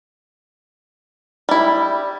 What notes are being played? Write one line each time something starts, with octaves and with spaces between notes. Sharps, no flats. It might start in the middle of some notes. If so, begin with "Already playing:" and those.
G3 E4